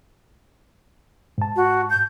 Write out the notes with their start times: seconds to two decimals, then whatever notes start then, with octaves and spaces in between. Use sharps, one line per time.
1.38 G#2 A5
1.56 F#4
1.90 G6